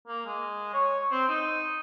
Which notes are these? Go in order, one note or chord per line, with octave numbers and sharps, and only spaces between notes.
A#3
G#3
C#5
C4
D#4